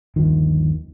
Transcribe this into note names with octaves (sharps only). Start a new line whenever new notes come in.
G1 D#2 D#3 F3